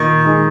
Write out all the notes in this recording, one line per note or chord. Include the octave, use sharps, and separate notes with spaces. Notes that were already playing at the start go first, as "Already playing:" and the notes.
Already playing: A#2 D#3
G#3 D#4 G#4